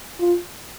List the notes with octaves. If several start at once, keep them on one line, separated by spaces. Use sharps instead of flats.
F4